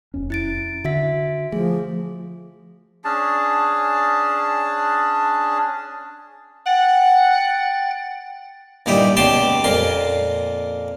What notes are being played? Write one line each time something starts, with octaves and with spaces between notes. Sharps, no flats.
E1 F2 C#4
E4 A6 D7
D3 F#4 E5 B6
F3 A3 G#4
C#4 D4 G#4 A5
F#5 G5 A6
G2 A#2 D#4 E4 G4
C#2 B2 G4 G5 A5 C6
F2 A#2 A#3 C6